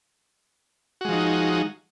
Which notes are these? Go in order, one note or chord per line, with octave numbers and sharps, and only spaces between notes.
F3 G#3 D#4 F#4